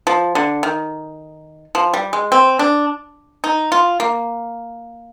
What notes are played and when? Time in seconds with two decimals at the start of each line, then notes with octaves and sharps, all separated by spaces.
0.07 F3
0.35 D3
0.63 D#3
1.75 F3
1.94 G3
2.13 G#3
2.32 C4
2.59 D4
3.44 D#4
3.72 F4
4.00 A#3